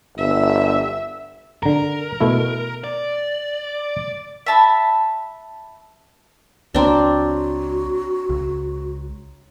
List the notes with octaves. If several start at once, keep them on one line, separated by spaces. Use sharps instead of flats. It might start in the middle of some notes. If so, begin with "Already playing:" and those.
G1 E5
D3 A#4 A#5
B2 A3 E4
D5
E5 A5 B5
C#2 C4 D4 F#4 C#5 A#5 C6
C#2